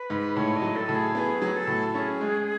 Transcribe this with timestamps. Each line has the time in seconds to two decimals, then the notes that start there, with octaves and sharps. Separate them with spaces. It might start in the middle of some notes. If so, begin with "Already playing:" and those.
Already playing: B4
0.10 G#2
0.36 A2 C#5
0.56 D#5
0.62 F#3
0.76 A4
0.89 A2
0.95 G#4
1.15 B3 G#4
1.42 F#3
1.54 A4
1.67 A2
1.94 C#4 G#4 A4
2.21 G#3